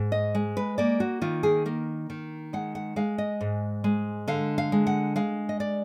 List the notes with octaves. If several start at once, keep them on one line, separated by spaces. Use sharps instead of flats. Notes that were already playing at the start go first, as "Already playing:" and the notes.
Already playing: G#2
D#5
G#3
B4
A#3 D5
F#4
D#3 F4
G#4
A#3 A#4
D#3
G#3 F#5
F#5
G#3 F5
D#5
G#2
G#3
D3 F5
F5
G#3
F#5
G#3 F5
D#5
D5